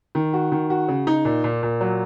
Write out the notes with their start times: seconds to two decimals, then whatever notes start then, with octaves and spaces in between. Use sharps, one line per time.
0.15 D#3
0.33 F#4
0.52 D#3
0.70 F#4
0.88 C#3
1.07 D#4
1.25 A#2
1.44 A#2
1.63 A#2
1.81 F#3